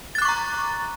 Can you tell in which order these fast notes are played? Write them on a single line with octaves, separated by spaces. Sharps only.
A6 F#6 D6 C#6 A#5